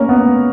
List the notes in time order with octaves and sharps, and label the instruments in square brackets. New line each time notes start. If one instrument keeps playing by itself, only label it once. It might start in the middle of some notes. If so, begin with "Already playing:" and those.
Already playing: [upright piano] A#3 C#4 A#4
B3